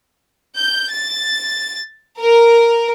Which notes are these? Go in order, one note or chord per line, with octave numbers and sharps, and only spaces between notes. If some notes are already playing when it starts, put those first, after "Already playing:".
G6
A6
A#4